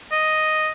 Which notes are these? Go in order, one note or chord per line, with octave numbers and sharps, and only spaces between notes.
D#5